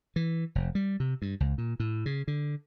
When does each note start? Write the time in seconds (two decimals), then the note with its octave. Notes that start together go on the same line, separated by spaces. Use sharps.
0.16 E3
0.55 F1
0.75 G3
1.00 C3
1.22 G2
1.40 C#2
1.58 A#2
1.80 A2
2.06 C#3
2.28 D3